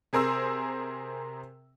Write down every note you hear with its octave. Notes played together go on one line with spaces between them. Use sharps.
C3 G#4 A#4 C5 E6